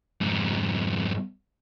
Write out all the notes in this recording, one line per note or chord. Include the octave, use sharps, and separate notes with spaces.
F2 G#2